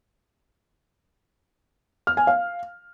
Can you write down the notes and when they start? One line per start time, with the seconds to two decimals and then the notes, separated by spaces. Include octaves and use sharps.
2.07 F6
2.17 G#5
2.27 F5